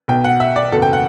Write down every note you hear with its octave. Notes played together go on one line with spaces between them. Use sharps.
B1 B2 G5
F#5
E5
D5
F#1 E2 B2 A4
G5
F#5